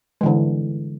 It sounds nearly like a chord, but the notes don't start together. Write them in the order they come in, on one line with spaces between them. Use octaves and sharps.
G#3 E3 D3